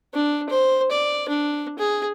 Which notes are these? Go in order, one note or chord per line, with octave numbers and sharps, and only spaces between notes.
D4
C5
D5
D4
G#4